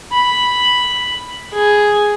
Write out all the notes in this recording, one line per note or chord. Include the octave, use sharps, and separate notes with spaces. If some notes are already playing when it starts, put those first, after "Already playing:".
B5
G#4